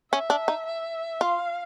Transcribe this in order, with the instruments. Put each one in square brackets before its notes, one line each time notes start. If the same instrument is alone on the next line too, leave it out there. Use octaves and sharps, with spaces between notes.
[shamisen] C#4 [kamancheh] E5
[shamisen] D4
D#4
[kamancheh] E5
[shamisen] F4 [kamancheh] F5